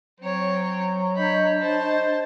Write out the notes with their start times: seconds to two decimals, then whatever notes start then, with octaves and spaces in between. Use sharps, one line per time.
0.20 F#3 C4 C#5
1.17 D4 C#5 D#5 B5 G6
1.61 C5 A5